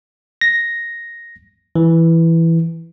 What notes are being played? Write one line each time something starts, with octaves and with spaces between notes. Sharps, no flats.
A#6
E3